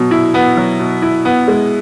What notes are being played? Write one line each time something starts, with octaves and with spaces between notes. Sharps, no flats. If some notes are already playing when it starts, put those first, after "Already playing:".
Already playing: B2 F#3
E4
B3
F#3
B2
E4
B3
G#3